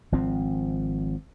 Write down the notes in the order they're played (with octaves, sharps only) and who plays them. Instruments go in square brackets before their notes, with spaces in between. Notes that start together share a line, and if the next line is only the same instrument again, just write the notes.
[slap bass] G#1 F3 C4